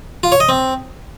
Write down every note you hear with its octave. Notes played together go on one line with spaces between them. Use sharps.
F4
C#5
D#5
C4